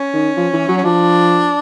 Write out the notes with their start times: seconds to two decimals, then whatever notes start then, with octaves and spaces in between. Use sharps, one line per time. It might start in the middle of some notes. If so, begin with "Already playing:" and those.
Already playing: C#4
0.13 D#3
0.37 F3
0.54 E3
0.69 F#3
0.78 C#4
0.84 F3 D4